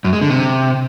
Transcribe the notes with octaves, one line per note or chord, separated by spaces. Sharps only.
F#2
G#3
D3
C3